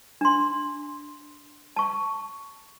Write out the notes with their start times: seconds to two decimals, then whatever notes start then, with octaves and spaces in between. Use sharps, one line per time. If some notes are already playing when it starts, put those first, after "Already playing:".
0.21 D4 C6
1.76 A5 C#6